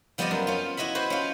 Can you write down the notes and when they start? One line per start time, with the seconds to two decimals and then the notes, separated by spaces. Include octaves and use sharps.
0.18 F3 G3 B3 C4 D5 D#5
0.31 F#2
0.47 C#4 F4
0.77 E4 F#4 D#5 E5 B5
0.95 F#4 B4 C5
1.10 C#4 F4